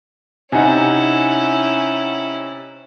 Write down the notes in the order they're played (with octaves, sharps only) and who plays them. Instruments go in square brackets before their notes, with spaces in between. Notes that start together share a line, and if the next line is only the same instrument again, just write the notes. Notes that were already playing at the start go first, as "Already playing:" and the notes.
[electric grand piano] C3 D#4 [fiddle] C#4 E4 [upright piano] F#5 G#5